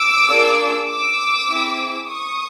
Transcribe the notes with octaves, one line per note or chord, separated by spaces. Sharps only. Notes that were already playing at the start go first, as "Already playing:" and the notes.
Already playing: D6 E6
A#3 D4 F4 G#4
D6 E6
C4 E4 G#4
C#6 D#6